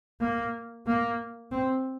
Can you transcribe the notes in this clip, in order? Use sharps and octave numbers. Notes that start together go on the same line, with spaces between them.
A#3
A#3
C4